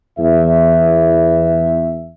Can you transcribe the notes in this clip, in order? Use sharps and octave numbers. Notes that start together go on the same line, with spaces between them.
E2 E5